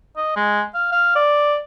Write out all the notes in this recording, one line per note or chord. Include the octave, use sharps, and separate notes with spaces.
D#5
G#3
F5
F5
D5